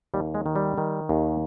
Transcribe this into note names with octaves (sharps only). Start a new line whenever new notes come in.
D#2 G3
G#3
D#3
G3
D#3
D#2